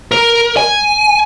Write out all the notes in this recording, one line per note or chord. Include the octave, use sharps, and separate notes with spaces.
A#4
G#5